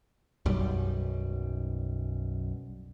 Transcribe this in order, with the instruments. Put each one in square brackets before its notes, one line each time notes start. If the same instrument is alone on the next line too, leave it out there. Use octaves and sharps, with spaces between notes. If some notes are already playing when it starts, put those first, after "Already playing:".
[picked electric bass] B1 F#2 G3